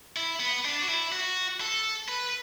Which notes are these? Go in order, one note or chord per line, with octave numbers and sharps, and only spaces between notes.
E4
B3
D4
F#4
E4
F#4
A4
B4